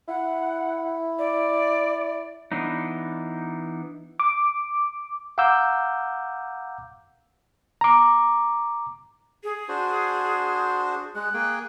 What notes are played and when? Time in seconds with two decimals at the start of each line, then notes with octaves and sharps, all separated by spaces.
0.08 E4 F#5
1.19 D5
2.52 E3 B3 D4 D#4
4.20 D6
5.38 F5 F#5 A#5 D6 E6 G6
7.81 A#5 D6
9.44 G#4
9.69 D4 F#4 C5
11.15 G#3 F#6
11.34 A#3 G#4 G5